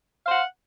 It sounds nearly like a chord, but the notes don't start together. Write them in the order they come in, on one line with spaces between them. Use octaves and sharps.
F5 C5 F#5